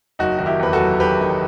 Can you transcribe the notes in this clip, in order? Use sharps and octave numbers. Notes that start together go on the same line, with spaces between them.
F#1 D#4 F#4
D#3 F#4
E4 G4
E2 B4
F#4 A4
F#3
F#1 G4 B4
D#3